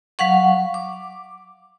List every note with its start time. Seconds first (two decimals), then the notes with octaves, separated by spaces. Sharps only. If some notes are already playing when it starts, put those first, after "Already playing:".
0.19 F#3 F5 F#5 C#6
0.74 D6